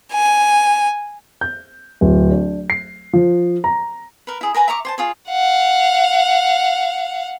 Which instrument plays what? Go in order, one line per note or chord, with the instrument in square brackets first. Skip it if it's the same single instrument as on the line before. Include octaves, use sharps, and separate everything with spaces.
[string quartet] G#5
[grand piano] G6
D1
D4
C7
F3
A#5
[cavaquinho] A#4 B4
E4 G#4
A#4 B4 G#5 A#5
E5 A#5 C#6 D6
C5 G#5 A5
F4 G#4 C#5
[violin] F5 F#5